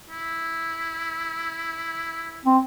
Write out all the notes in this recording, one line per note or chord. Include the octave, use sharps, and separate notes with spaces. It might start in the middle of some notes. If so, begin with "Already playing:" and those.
E4
C4